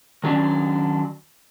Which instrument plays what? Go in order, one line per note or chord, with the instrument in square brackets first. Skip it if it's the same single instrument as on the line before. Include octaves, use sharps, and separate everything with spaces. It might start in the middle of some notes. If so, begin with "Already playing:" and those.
[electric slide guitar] D#3 F#3 C#4 D4